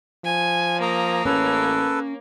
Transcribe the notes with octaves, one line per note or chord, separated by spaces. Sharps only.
F3 G#5
A#3 A#5 D#6
A1 C#4 A4 B4